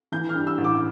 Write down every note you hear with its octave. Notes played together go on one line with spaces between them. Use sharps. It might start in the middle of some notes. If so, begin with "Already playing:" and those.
E3 G6
F6
G2
E6
A1
D6